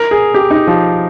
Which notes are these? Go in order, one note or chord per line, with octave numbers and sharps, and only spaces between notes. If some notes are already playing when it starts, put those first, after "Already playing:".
Already playing: A#4
G#4
G4
D#4
F3